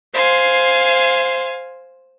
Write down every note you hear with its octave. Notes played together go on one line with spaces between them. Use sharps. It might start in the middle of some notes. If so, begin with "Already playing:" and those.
C5 F5 G#5